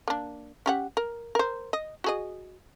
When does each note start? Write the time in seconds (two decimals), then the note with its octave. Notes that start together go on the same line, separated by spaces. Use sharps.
0.08 A#3 D4
0.66 C#4 G4 F#5
0.97 A#4
1.35 A#4 C5
1.73 D#5
2.04 F#4 G#4 D#5